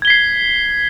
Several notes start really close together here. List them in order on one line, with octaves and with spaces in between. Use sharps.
G#6 G7 B6 C7